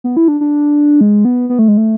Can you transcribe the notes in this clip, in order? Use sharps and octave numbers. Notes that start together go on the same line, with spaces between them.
B3
E4
D4
D4
G#3
B3
B3
A3
G#3
A3